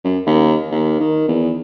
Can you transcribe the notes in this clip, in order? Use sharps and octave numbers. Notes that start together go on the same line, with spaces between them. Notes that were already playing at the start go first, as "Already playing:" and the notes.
F#2
D#2
D#2
D#3
E2